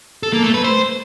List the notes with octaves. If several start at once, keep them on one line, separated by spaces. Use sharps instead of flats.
A4
A#3
A3
B4
C5